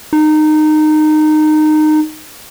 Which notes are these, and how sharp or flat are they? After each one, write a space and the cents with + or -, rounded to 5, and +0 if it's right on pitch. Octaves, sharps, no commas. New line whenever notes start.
D#4 -20